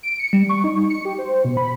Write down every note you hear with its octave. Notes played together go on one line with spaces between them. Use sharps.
D7
C#7
G3
C#6
D#4
C#7
G4
C5
B2
B5